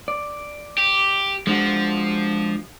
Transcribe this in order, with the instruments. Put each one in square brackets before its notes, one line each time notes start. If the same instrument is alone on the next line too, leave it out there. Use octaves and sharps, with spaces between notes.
[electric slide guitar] D5
[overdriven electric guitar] G4
[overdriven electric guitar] F3 [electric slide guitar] G#3 D4 F#4